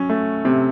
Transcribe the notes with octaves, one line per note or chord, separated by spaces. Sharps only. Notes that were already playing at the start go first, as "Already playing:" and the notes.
Already playing: F#3 C#4
A3
C3